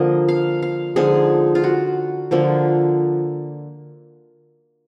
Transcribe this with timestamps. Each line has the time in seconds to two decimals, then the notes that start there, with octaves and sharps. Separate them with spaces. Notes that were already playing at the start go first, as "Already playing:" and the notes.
Already playing: D3 F3 A#3 D#5
0.29 F5
0.62 F5
0.96 D3 F3 G#3 D#4 G#4
1.55 F4
1.64 F#4
2.31 D3 F3 A#3